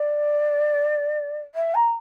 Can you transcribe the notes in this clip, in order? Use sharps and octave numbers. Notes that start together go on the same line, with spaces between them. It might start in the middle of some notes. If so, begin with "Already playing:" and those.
Already playing: D5
E5
A#5